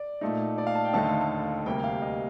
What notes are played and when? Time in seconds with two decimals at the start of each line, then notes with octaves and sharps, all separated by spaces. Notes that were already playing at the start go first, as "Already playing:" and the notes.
Already playing: D5
0.21 A#2 A3 D#4
0.58 D5
0.67 F5
0.75 A5
0.85 G5
0.93 D#2 D3 A3 D#4 A5
1.03 F5
1.21 A5
1.66 D2 C3 G3 A#3 G5
1.84 F5
2.02 D#5